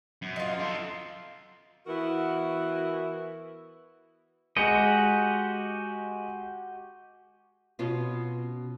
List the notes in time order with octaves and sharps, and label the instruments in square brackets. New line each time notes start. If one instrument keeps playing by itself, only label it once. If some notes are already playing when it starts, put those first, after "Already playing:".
[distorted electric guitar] F#2
[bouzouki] D#4 F4
[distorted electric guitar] A4 F5
[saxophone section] E3 B3 E4 F#4 A#4
[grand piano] G#3 C#7 [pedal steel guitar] F#4 G4 D#5
[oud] B2 C#4 F4